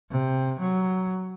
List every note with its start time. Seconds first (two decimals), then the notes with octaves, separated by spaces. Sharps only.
0.11 C3
0.60 F#3